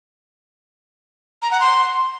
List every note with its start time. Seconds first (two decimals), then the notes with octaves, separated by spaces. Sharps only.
1.42 A#5
1.51 F#5
1.60 C6